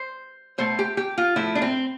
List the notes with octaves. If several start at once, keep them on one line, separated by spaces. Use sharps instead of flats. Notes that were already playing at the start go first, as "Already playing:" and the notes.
Already playing: C5
B2 A3 C5
G4
G4
F4
A2 F3 A3 E4
D4
C4